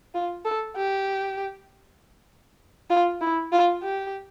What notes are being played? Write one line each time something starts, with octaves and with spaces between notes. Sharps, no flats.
F4
A4
G4
F4
E4
F4
G4